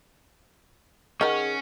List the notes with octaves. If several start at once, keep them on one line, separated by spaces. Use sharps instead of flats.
D#3 C#4 G#4 A#4 F#5 C#6